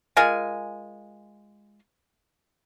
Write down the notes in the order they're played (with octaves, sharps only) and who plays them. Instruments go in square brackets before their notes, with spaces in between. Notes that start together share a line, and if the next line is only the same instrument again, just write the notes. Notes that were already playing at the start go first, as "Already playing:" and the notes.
[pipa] G#3 F4 A#4 G#5